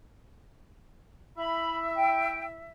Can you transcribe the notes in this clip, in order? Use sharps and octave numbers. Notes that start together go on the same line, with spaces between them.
E4 E5 B5
G5